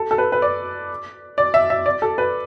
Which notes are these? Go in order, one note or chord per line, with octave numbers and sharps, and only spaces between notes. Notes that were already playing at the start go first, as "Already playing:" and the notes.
Already playing: A4
A4
B4
B4
D5
D5
E5
E5
D5
A4
B4